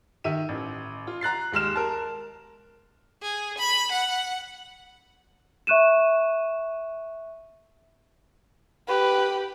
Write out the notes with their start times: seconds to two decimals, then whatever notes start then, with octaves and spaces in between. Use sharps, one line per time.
0.24 D#3 E5 D#7
0.49 A1
1.07 F4
1.21 A#5 F#6 A6 C7
1.52 D#2 G#3 F6 E7
1.76 A#4 A5
3.22 G#4
3.58 B5
3.92 F#5
5.67 E5 C#6 F#6 D#7 E7
8.88 G4 B4